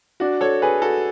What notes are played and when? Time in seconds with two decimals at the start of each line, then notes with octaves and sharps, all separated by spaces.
0.20 D4 F#4
0.41 A4 C#5
0.62 G#4 B4
0.82 F#4 A4